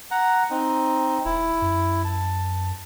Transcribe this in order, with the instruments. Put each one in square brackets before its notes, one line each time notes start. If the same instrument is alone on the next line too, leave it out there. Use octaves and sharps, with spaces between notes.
[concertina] F#5 A#5
C4 D#4
[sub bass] D#1 [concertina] E4
[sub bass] F#2
[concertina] A5